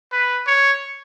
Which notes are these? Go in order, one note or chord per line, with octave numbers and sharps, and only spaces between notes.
B4
C#5